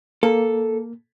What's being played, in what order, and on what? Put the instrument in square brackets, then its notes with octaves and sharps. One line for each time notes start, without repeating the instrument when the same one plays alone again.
[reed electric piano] A#3 [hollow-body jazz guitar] A4